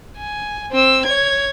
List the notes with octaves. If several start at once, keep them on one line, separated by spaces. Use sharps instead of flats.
G#5
C4 E6
C#5 G#6